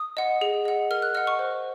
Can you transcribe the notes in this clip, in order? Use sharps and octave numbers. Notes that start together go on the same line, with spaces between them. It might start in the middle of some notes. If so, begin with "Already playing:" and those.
Already playing: D#6
D#5 F#5
G#4
D#5 F#5
A#4 F6
F#6
D#5 F#5 F6
C#6
C5